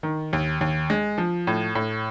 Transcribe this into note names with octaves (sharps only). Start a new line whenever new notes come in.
D#3
D#2
D#2
G#3
F3
A2
A2